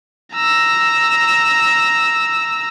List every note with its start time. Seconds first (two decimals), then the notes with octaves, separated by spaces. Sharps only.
0.35 A#5 E6